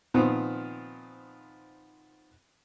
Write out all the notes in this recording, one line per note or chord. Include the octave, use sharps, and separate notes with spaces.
A#2 D#3 F3 B3 C4